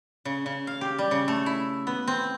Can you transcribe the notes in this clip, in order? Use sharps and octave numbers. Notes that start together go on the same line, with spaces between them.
C#3
C#3
F5
G4
G3
C#3
A3
E4
B3
C4